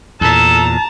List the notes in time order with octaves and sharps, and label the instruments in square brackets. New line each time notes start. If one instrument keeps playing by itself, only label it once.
[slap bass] E2 A#2 [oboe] A4 [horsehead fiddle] A5 A#5